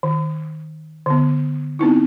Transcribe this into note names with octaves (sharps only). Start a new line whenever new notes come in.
D#3
D3 B3
B3 C4 D#4 E4